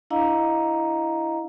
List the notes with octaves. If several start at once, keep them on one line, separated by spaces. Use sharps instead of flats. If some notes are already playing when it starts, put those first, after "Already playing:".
D4 E4 D#5 F5 A#5